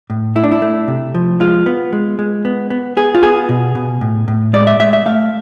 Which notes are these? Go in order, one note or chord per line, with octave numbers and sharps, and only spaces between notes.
A2
A3 E4
D4
E4
A3
C3
F3
G#3 F4
B3
G#3
G#3
B3
B3
B3 G#4
F4
B3 G#4
B2
B2
A2
A2
G#3 D5
E5
G#3 E5
E5
A3 F5